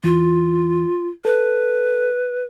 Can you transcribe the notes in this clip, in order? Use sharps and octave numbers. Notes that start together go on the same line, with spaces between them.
E2 E3 F4
A4 B4